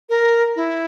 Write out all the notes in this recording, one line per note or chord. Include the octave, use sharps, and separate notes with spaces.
A#4
E4